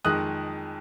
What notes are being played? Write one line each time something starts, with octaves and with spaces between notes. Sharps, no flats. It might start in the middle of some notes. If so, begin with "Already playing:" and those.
F2 D#3 G#3 D#6 F#6